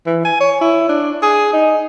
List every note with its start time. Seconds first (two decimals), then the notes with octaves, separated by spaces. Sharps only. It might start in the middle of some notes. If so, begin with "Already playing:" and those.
0.06 E3
0.25 G#5
0.40 C#5
0.61 E4
0.89 D4
1.23 G#4
1.53 D#4